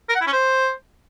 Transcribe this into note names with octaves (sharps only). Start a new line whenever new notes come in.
A#4
F#5
E4
C#4
C5